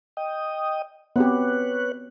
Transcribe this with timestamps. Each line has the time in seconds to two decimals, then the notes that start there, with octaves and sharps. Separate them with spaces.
0.17 D#5 G5 D#6
1.16 B3 C4 G4 B4 C#5 F#6